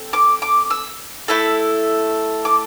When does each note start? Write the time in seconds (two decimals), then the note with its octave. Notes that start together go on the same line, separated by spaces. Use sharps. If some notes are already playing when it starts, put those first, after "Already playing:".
Already playing: C4 A4
0.13 D6
0.42 D6
0.70 E6
1.28 A3 E4 A4
2.45 D6